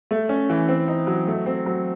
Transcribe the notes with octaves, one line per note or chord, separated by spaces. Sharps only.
A3
C#4
E3
C4
D#4
F#3
A3
C4
F#3